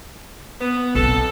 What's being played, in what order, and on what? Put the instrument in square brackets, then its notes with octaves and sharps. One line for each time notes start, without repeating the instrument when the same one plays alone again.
[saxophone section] B3
[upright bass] B1 C4 [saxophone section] A4